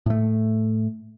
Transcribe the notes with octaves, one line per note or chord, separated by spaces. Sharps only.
A2 A3